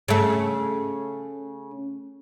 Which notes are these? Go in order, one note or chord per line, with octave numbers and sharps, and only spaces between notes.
C#3 A3